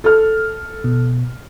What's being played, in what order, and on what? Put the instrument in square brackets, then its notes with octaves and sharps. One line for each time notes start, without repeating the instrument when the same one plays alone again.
[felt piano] A4 F6
[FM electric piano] B2